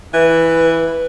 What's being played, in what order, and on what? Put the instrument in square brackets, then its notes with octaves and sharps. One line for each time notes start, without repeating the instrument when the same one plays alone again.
[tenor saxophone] E3 [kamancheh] B4